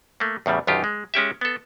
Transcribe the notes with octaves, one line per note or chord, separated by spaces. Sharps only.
A3 A#3
E2 A2 C#3 G3
B1 F#2 D3 D#3 F4 G4
G#3
G#3 C#4 G4 E5
B3 A4